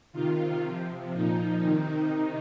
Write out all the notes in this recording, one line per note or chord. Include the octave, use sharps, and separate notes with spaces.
C3 D#3 F4
C3 F3
A#2 F3 D#4
C3 D#3